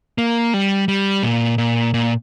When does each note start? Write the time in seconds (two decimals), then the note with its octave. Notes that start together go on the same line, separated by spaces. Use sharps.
0.18 A#3
0.54 G3
0.88 G3
1.23 A#2
1.58 A#2
1.94 A#2